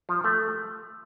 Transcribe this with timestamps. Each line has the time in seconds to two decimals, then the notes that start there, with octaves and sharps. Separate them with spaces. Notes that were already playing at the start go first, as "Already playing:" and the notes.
0.09 F3
0.24 A3